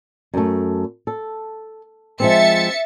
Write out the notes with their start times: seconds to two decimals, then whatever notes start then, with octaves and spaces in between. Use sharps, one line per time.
0.34 F#2 A3
1.07 A4
2.20 F3 G#3 C4 E5 A6 C#7